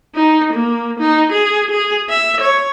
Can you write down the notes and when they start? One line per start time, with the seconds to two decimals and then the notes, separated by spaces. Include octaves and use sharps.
0.15 D#4
0.53 A#3
1.00 D#4
1.32 G#4
1.71 G#4
2.09 E5
2.41 C#5